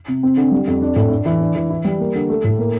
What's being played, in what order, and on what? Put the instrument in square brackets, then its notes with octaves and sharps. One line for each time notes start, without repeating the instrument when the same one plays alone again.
[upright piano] C3
C4
D3
G3
F2
D4
A2
D4
E3
D4
E3
E4
G3
A#3
D3
A3
A2
A#3